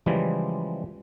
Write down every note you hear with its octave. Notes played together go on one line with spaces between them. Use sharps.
C#3 E3 F3 G3 G#3